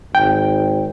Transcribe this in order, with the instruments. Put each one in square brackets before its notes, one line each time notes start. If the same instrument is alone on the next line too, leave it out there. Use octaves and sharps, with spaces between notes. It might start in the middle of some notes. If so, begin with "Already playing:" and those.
[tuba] G#1 [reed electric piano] G5